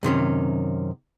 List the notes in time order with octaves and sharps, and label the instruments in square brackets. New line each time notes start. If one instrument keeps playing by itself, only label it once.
[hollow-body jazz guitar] F#2 C3 D#3 C#4